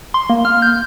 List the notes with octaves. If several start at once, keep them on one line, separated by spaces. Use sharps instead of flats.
C6
A#3
F6
G6